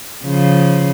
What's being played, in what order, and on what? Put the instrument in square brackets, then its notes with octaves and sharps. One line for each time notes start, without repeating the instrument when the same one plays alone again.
[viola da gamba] C#3 F3